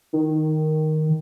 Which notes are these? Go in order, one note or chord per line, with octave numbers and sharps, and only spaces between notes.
D#3